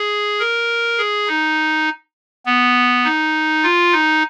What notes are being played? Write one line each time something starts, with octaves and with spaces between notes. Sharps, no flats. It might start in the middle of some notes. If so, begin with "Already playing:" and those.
Already playing: G#4
A#4
G#4
D#4
B3
D#4
F4
D#4